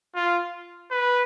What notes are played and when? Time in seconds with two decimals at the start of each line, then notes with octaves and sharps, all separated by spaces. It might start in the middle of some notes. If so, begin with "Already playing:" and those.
0.15 F4
0.91 B4